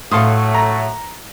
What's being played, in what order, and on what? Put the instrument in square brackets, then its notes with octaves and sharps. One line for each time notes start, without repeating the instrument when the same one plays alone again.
[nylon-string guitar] A2 A4 [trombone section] F#3 A3 [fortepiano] F5 C6 D#6
[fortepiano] A#5